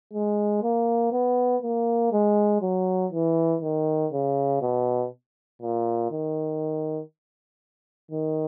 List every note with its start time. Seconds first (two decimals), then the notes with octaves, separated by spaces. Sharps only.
0.13 G#3
0.62 A#3
1.12 B3
1.62 A#3
2.12 G#3
2.62 F#3
3.12 E3
3.62 D#3
4.12 C#3
4.61 B2
5.62 A#2
6.11 D#3
8.11 D#3